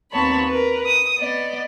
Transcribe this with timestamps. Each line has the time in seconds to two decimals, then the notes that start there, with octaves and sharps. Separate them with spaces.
0.11 D#2 B3 C4 C#5 A5 B5
0.47 A#4 B4
0.85 D#6
1.17 B3 D5 D#5